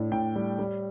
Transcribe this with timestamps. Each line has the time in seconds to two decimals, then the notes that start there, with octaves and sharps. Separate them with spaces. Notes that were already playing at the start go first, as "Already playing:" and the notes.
Already playing: A2 D4
0.12 A2 G5
0.36 G3
0.59 G3